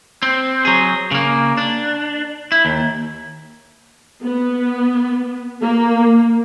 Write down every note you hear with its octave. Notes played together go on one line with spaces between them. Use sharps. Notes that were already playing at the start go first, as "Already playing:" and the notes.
C4
F#3 G#4
C#3 A#3
D4
E4
D#2
B3
A#3